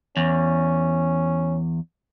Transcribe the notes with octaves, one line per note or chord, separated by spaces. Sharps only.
E2 C#4